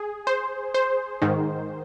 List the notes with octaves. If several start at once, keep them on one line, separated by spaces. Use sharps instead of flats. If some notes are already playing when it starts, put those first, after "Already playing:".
Already playing: G#4
C5
C5
G#2 D#3